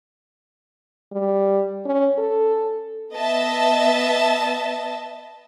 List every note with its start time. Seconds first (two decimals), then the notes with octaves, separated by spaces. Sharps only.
1.12 G3
1.86 C#4
2.18 A4
3.14 B3 D#5 E5 A5